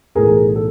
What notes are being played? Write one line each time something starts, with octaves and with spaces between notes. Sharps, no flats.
B1 A2 E3 A3 G#4 A#4
A4